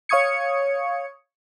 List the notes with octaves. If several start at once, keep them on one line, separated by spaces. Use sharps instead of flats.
C#5 F5 C#6 D#6 G#6 C#7